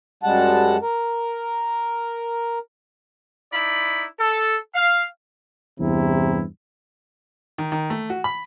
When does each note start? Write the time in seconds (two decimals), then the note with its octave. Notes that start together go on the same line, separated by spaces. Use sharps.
0.23 F#2 G3 G#3 F#5 A5
0.82 A#4
3.52 D#4 E4 D5 B5
4.19 A4
4.74 F5
5.80 E2 G2 C3 E4
7.58 D#3
7.72 D#3
7.90 A3
8.10 F#4
8.24 B5